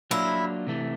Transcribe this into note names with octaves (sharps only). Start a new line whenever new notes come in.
F#3 A#3 D4 E4 F4
C3 E3 A3